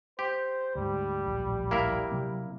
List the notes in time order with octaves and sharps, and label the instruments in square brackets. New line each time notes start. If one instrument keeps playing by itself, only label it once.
[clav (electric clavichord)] G4 [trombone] C5
[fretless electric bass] D2 G#2 [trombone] G3
[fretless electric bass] D1 A#1
[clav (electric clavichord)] A#3 E4 A#4
[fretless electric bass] C3 F#3 C4